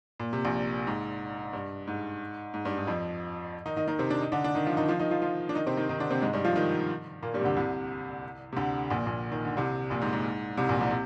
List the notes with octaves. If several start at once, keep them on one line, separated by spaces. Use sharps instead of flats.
A#2
C3
A#1 A#2
G#2
G2
G#2
G#2
G2
G#2
F2 F3
D#3 D#4
D#3 D#4
D#3 D#4
C3 C4
D4
D#4
D3 D4
D4
D#3 D#4
F3 F4
D#3 D#4
F3 F4
D#3 D#4
F3 F4
F3 F4
D4
D#3 D#4
C3 C4
D#3 D#4
D#3 D#4
D3 D4
C3 C4
G#2 G#3
G2 G3
F3 F4
D#3 D#4
A#2 A#3
G2 G3
C3
D2 D3
C2 C3
C3
D2 D3
A#1 A#2
A#1 A#2
D#3
D3
C2 C3
A#1 A#2
G#2
G#2
C2 C3
A#1 A#2
C2 C3
C3